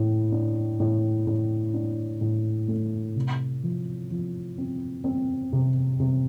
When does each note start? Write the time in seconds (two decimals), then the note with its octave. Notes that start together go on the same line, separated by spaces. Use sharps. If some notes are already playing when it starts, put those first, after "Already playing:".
Already playing: A2
0.32 D4
0.80 A2
1.27 A2
1.74 D4
2.21 A2
2.68 A3
3.16 C3
3.63 F3
4.11 F3
4.58 C4
5.04 C4
5.53 C3
6.00 C3